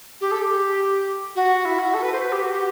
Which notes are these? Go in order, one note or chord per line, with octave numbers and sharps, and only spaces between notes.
G4
A4
G4
F#4
E4
F#4
A4
B4
C5
B4
G4
F#4
G4